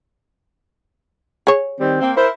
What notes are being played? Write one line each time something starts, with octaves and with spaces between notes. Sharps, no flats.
G#4 C#5
D#3 G3 C4
A#3 C4
E4 A#4 C5